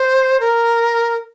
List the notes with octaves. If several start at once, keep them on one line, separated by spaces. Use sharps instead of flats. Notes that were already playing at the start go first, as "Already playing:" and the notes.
Already playing: C5
A#4